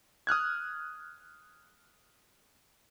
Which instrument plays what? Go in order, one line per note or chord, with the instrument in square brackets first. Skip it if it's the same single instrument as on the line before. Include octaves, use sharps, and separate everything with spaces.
[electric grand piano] D#6 F6 F#6 G#6